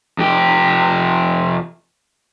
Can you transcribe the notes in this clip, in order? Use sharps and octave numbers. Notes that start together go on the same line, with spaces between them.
F2 G4